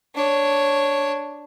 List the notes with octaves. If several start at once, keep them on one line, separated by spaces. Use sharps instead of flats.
D4 C#5